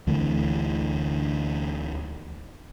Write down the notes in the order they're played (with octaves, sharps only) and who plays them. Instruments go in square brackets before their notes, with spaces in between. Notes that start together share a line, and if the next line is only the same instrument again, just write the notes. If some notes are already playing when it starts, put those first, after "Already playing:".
[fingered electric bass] D2 D3 E3 A3